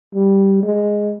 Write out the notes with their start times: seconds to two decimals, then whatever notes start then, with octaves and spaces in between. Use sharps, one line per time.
0.15 G3
0.63 G#3